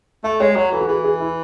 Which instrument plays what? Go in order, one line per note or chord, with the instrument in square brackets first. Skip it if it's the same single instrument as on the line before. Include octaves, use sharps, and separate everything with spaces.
[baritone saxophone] A3 [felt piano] E5
[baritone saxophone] G#3 [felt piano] C#5
[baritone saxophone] F#3 [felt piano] C#5
[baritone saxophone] E3 [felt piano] A4
[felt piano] F#4
[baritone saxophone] E3 [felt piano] G#4
[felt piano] G#4
E4